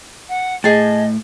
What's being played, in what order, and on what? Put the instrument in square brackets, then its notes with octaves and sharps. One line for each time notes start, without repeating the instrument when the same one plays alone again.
[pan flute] F#5
[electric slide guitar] A2 [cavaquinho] G#4 A5 [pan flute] D#5